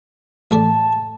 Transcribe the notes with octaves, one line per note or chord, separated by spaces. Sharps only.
A1 A3 D5 A5